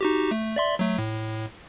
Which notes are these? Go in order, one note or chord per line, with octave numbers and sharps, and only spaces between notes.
D#4 F#4 G4
A3
D5 E5 C6
F#3 A3
A2